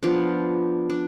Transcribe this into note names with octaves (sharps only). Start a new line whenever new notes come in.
F3 B3 D4
D4